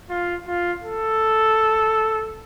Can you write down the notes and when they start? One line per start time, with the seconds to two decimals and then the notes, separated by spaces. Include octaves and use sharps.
0.10 F4
0.47 F4
0.83 A4